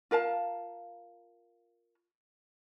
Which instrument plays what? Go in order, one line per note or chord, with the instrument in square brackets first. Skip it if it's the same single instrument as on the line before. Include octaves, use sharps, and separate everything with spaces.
[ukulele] F4 A#4 F5 A5